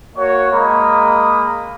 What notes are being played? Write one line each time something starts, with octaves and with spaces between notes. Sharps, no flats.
A#3 F#4 C#5
G#3 A#3 A#5 B5 D#6